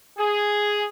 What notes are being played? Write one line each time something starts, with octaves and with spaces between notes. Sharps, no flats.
G#4